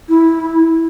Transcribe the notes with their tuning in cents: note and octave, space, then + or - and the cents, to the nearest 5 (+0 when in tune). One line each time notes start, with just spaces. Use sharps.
E4 -10